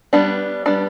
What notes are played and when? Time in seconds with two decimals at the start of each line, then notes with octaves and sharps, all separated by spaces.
0.13 G3 B3 D4
0.66 G3 B3 D4 D5